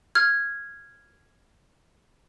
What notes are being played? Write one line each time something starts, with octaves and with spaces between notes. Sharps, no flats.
F6 G#6